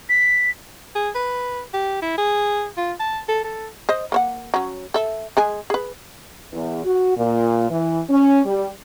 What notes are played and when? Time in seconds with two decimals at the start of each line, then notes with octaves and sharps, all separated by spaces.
0.09 B6
0.95 G#4
1.15 B4
1.74 G4
2.02 E4
2.18 G#4
2.77 F4
3.00 A5
3.28 A4
3.44 A4
3.89 C5 D#5
4.12 A#3 C5 F#5
4.54 F#3 C#4
4.94 A4 E5
5.37 G#3 G#4 G#5
5.70 G#4 B4
6.52 E2
6.84 F#4
7.16 A#2
7.70 E3
8.09 C#4
8.45 G3